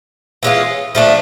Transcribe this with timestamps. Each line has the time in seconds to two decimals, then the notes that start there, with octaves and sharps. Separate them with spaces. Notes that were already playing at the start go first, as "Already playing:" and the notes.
0.43 E3 G#3 C#4 F4
0.95 F3 A3 D4